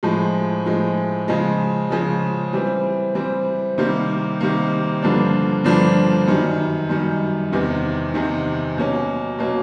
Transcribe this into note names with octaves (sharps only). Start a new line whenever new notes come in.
A2 F3 G#3
A2 F3 G#3
C#3 F3 G#3
C#3 F3 G#3
E3 G3 C4
E3 G3 C4
C3 D#3 G3 A#3
C3 D#3 G3 A#3
G2 D3 F3 A#3 D4
G2 D3 F3 A#3 D4
F#2 D#3 G3
F#2 D#3 G3
E2 C3 D#3
E2 C3 D#3
B2 F#3 A#3 C#4
B2 F#3 A#3 C#4